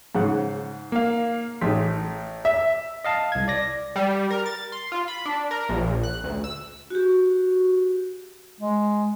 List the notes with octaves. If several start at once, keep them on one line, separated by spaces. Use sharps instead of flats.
G#2 C#3 F#5
A#3 F5
A1 A3 G#4 B6
E5
D#5 F5 A5
C2 G#6
D5 A#6
G3
A#4
A6
C6
F4
B5
D4
A#4
A#1
F#6
D2
E6
F#4 G4
G#3